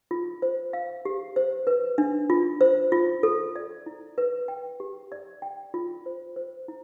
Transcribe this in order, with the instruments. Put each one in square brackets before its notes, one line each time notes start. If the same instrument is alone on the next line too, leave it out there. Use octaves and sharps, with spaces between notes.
[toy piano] F4
C5
F5
G4
C5
B4
D4
F4
C5
F4
A4
D5
E4
B4
G5
G4
D5
G5
F4
C5
C5
E4